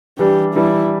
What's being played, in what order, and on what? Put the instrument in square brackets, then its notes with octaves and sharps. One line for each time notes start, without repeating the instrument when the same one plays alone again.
[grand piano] E3 G3 D4 [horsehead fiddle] G4
[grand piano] E3 G3 D4 [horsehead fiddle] E4